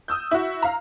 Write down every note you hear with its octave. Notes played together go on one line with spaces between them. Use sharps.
D#6 E6 G6
E4 F#4
F5 A#5